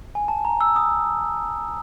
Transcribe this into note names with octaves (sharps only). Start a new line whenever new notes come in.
G#5
A5
A#5
E6
D#6